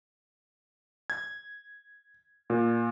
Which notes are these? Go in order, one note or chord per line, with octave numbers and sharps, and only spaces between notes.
G#6
A#2